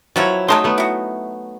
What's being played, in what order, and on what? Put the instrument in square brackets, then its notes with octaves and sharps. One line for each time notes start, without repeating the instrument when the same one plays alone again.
[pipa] B2 F3 E4 [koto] F#3 C#5
[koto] F#3 A3 D#4 [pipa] G#3 A5 C6
[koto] A3 B3
[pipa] E4 F#4